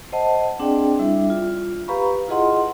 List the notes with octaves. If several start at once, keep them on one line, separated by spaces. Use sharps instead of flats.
C5 D#5 F#5 A5
C4 D4 G#4 D5 G5
G3 D4 E4 E5
F4
G4 B4 F5 A#5 B5 C#6
E4 F4 G#4 D#5 F#5 C6